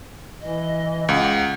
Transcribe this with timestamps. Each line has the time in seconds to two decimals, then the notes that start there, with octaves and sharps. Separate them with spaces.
0.41 E3 D#5
1.09 C#2 F#5